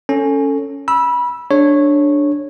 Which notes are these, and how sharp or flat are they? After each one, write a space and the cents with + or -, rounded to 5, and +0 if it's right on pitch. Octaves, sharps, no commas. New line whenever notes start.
C#4 +0 A4 +15
B5 -25 E6 +0
D4 +0 G#4 +0 C#5 -10